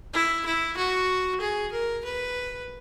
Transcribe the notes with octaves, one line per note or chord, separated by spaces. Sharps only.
E4
E4
F#4
G#4
A#4
B4